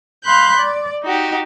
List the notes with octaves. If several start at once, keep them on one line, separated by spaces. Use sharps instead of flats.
F5 B5 C6 F#6 G6
D5
D#4 F#4 G4